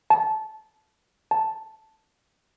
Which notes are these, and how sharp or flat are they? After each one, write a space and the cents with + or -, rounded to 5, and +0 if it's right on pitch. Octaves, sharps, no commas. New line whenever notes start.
A5 -15
A5 +0